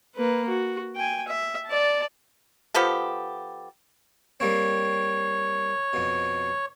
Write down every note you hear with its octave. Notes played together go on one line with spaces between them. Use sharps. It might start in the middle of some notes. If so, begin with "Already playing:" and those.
A#3 B4
F#4
G5 G#5
E5
D5 A5
F3 B3 G4 A4
G3 A#3 C4 C#5
F2 B2